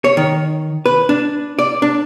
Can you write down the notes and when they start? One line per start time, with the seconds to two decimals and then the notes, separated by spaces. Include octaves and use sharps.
0.04 C#5
0.17 D#3
0.86 B4
1.09 D4
1.59 D5
1.82 D4